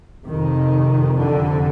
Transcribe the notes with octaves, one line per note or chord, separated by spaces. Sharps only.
F2 C3 D#3
D3